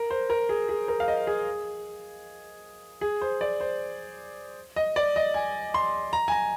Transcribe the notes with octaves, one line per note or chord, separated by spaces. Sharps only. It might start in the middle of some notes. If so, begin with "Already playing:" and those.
Already playing: A#4
C5
A#4
G#4
G#4
A#4
F5
D#5
G#4
G#4
C5
D5
C5
D#5
D5
D#5
G#5
C6
A#5
G#5
A#5